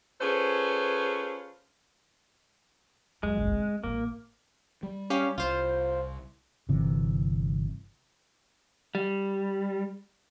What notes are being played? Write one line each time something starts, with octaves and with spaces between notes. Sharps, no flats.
C#4 F4 G#4 A4 B4 C5
F#2 G#3
F#1 B1
C4
A1 A#3
G3
C#4 G4 F5
C2 F4 C5
G1 C3 E3
G3